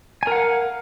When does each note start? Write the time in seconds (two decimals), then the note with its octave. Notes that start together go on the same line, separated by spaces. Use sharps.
0.23 G#5
0.27 A#4
0.32 F#5
0.36 F5